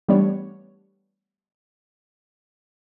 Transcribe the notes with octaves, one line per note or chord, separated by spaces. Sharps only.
E3 G3 A3 B3 D4 C#5